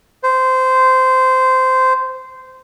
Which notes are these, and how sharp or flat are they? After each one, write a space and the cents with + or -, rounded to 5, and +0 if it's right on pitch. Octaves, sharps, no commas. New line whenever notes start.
C5 -15